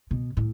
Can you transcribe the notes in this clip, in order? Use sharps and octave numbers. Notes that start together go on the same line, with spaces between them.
B2
A2